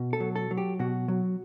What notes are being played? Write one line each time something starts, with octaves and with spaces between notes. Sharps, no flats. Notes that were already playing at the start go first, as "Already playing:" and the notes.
Already playing: B2
A4
F#3
A4
F#3
G4
B2 F#4
F#3